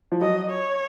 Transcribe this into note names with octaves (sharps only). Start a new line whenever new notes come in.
F3
F#3 D#5
C#5